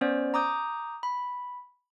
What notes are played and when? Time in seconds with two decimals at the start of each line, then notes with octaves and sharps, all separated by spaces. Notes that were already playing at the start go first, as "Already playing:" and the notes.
0.01 B3 C#4 C5 D5
0.34 A#5 D6 D#6 G6
1.03 B5